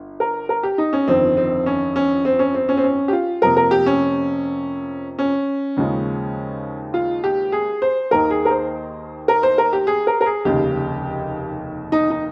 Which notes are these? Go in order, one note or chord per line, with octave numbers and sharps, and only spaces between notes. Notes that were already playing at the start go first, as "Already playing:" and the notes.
Already playing: G1
A#4
A#4
G4
D#4
C#4
G1 F2 D#3 C4
C4
C#4
C#4
C4
C#4
C4
C#4
C4
C#4
G4
F4
F2 C3 F3 A#3 A#4
A#4
G4
C#4
C#4
D#2 C#3 F3 G#3
F4
G4
G#4
C5
D#2 D#3 A#3 A#4
G#4
A#4
C5
A#4
C5
A#4
G4
G#4
A#4
A#4
G#4
F1 D#2 C#3 G4
D#4
D#4